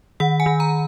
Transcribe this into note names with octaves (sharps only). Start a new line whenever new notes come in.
D#3 F#5
G#5
D#3
A#5